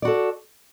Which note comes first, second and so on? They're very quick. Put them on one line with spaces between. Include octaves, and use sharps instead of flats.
D5 F#4 A4